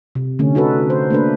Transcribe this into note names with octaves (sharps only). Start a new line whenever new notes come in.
C3
D3 A3 C#4
D#4 F#4 A4 B4
C5
A3 A#3 D4 B4